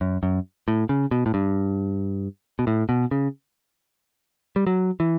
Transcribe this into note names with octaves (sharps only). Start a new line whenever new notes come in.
F#2
F#2
A2
C#3
B2
A2
G2
B2
A2
B2
C#3
G3
F#3
E3